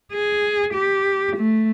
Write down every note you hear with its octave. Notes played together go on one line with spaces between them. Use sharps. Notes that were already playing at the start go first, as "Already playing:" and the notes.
G#4
G4
A3